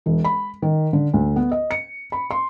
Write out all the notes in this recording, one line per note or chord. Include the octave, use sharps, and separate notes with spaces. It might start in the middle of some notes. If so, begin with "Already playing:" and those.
E1
B5
D#3
D3
D2
B3
D#5
C#7
B5
C6